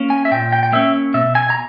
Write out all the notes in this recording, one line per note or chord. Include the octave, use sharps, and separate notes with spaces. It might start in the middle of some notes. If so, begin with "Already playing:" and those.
Already playing: A#3 C#4
G#5
E5
A#2 G5
G5
G5
A#3 C#4 E5
B2 E5
G#5
A#5